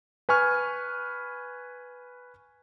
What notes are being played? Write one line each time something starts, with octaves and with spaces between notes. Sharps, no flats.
B4 G#5 C#6 F6